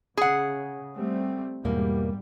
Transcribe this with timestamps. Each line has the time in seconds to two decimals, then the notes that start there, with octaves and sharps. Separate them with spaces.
0.17 C#3 G#4 F#5
0.95 G3 A3 C4
1.65 E2 G#2 B2 G3 A#3